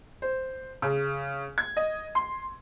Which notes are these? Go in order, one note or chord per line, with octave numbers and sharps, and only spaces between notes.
C5
C#3
G#6
D#5
C6